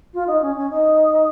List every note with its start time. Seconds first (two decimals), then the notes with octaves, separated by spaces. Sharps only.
0.14 F4
0.27 D#4
0.41 C#4
0.56 C#4
0.70 D#4